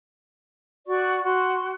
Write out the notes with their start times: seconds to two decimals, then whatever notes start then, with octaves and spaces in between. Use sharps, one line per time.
0.88 F#4 D5 C#6
1.24 F#4 C6